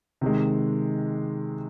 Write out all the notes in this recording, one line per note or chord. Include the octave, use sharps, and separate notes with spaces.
C3 D#3 G#3